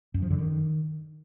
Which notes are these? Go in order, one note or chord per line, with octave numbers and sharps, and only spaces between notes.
F#2
F3
D3
D#3